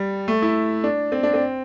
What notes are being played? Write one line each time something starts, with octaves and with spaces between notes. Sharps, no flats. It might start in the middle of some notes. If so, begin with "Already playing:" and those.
Already playing: G3
A3
E4
D4
C4
D4
C4